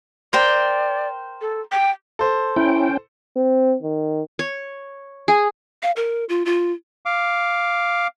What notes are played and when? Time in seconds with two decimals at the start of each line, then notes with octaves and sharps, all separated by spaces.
0.33 A#4 C5 D5 G5
1.41 A4
1.72 G5
2.19 A4 C5
2.56 C#4 E4 G5
3.36 C4
3.83 D#3
4.39 C#5
5.28 G#4
5.83 F5
5.96 A#4
6.29 F4
6.46 F4
7.06 F5 D6